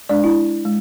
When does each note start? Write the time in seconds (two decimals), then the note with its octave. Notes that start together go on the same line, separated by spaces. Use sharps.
0.09 G#3 D4 D5
0.24 E4
0.65 G#3